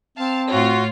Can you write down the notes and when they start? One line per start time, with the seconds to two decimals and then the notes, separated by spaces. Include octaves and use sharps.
0.18 C4 F5 A5
0.50 A2 F4 F#4 C#5